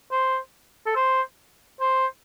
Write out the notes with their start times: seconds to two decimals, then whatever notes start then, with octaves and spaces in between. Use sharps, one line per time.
0.11 C5
0.86 A4
0.96 C5
1.80 C5